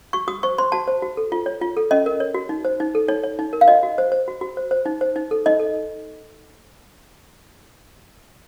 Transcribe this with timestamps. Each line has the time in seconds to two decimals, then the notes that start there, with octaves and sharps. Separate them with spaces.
0.13 F#4 C#6
0.28 F#4 D#6
0.43 C5 C#6
0.58 C5 C6
0.72 F#4 A5
0.88 C5
1.02 F#4
1.17 A4
1.32 F4
1.46 C#5
1.62 F4
1.77 A4
1.91 C#4 D#5
2.06 A#4
2.20 C#5
2.34 F#4
2.49 D#4
2.65 C5
2.80 D#4
2.95 A4
3.08 D#4 C#5
3.23 C#5
3.39 D#4
3.53 A#4
3.61 F5
3.68 F#4 D#5
3.83 F#4
3.98 C5
4.12 C5
4.28 F#4
4.41 F#4
4.57 C5
4.71 C5
4.86 D#4
5.01 C5
5.16 D#4
5.31 A4
5.46 D#4 D#5
5.59 A4